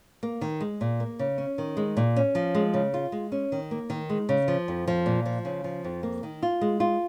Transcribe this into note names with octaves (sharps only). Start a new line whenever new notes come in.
A#3
D#3
G#3
A#2
A#3
C#3
C#4
D#3
G#3
A#2
C#4
F3
G#3
C#3
F4
G#3
C#4
D#3
A#3
D#3
G#3
C#3
F3
F2
F3
A#2
F3
C#3
F3
F2
A#3
D#3
F4
G#3
F4